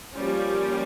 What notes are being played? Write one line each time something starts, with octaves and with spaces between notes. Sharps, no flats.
F3 G3 A#3 C#4 G4